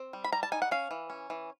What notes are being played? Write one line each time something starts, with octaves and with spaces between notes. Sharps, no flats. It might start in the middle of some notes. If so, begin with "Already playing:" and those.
Already playing: C4
G3
B5
G3 A#5
A5
D#4 G#5
F#5
C#4 F5
E3
C#4
E3